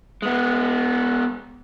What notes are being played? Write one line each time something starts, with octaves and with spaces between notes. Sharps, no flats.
G#3 B3